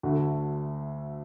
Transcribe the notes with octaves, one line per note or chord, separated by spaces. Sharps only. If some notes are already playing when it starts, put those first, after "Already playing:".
D2 D3 A3 F#4